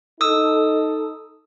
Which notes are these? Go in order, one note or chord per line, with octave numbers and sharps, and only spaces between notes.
D#4 A4 D#6 E6